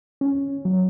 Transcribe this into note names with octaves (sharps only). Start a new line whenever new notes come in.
C#4
F#3